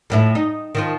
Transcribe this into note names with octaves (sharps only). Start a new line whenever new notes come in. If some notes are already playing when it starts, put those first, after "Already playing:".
F2 A2 E4
D#4
D#3 F3 F4